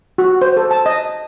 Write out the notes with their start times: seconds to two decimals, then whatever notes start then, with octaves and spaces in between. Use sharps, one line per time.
0.18 F#4
0.42 C5
0.57 A4
0.71 A5
0.86 D#5